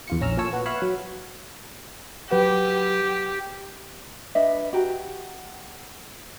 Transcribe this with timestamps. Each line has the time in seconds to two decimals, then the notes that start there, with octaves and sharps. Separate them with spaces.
0.07 E2 F4 C#7
0.21 A#1 C#4 A#5 E6 F6
0.37 A#2 C#4 F4 A4 C#5 E6
0.53 B3 F#4
0.66 B4 C#5 E5 F5 E6 F#6
0.82 F#3
2.31 F#3 G4 B4 F#5
4.35 D4 B4 D#5 E5
4.73 F#4 G4 A#5